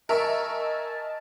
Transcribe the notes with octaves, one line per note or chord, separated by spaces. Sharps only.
A#4 D#5 E5 G#5 A5 C#6